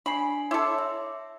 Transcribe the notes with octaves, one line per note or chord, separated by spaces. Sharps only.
D4 G#5 B5 C7
E4 A4 C#5 C6 D6
E5